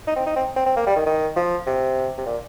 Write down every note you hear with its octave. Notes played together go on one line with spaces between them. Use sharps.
D#4
C4
D#4
C4
C4
C4
A#3
G3
D#3
D#3
F3
C3
C3
A#2